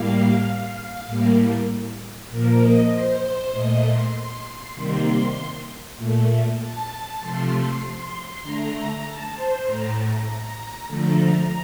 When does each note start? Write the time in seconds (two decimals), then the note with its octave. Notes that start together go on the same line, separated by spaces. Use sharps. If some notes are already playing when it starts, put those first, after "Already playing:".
Already playing: A2 G3 A#3 F5
1.07 A2 G3 A#3
2.30 A#2 F3 A#3 A#4
2.60 D#5
2.91 C5
3.52 A#2 A3 D#5
3.83 C6
4.75 C3 D#3 G3 A#3
5.98 A#2 A3
6.60 A5
7.20 C3 F3 A3 C6
8.43 D3 A3 A#5
8.73 A#5
9.05 A5
9.35 C5
9.66 A2 A3 A#5
9.97 A#5
10.28 A#5
10.88 D3 F3 A3